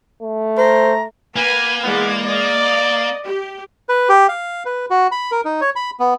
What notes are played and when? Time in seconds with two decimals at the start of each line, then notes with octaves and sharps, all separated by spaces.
0.22 A3
0.58 C5 A#5
1.36 A#3 B4 G#5
1.82 E3 G#3 B3 D5
2.26 D5 D#5
3.24 G4
3.89 B4
4.09 G4
4.29 F5
4.65 B4
4.90 F#4
5.12 B5
5.31 A#4
5.45 D#4
5.61 C#5
5.76 B5
6.00 B3